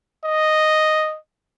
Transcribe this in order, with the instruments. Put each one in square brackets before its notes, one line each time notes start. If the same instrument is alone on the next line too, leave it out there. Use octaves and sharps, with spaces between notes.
[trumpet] D#5